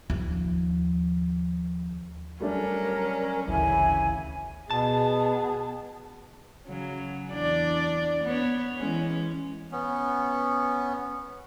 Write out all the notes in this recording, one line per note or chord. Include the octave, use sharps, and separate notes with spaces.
D#2 F3
F#3 G3 A3 C#4 D4 A#4
G#1 D2 C#3 E3 E4 G#5
B2 B3 G#4 A5
C#3 F#3
E2 D4 D5
B3 C#5
E3 G#3 C#4
B3 C#4